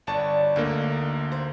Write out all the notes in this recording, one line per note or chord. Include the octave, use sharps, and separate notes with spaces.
G1 D3 F#4 C#5 A5
D2 D3 A#3 D#4
C5